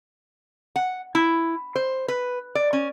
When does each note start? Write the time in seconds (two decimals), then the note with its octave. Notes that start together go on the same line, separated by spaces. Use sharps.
0.76 F#5
1.15 E4
1.76 C5
2.08 B4
2.55 D5
2.73 C#4